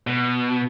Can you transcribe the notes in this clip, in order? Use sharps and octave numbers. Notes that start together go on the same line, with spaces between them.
B2